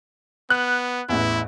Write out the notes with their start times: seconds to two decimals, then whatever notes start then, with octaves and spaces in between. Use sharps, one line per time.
0.50 B3 F#6
1.09 A1 E2 E4